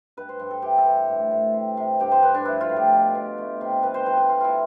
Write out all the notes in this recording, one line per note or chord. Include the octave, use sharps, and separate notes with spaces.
G2 B4
C5
G2
A4
E3 G4
A4
E3
A2
A2
C3
C3
G2 G4
C5
G2 B4
D4
F3 E4
F4
A2
G4
B2
B2
A3
C3
G3 B4
C5
G3 B4
B4
G3 F4
E4 F4